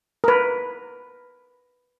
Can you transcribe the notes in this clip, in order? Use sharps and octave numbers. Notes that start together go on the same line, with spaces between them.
A#4 B4